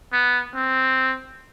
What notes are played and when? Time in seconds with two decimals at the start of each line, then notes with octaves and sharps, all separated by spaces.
0.13 B3
0.55 C4